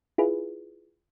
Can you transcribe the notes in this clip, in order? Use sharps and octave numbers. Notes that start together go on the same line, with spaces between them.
E4 F4 G#4 B4